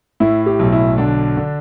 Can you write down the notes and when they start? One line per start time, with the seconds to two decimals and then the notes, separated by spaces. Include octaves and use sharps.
0.20 A2 E4
0.46 G4
0.59 B1
0.72 E4
0.98 D3 D4
1.37 D3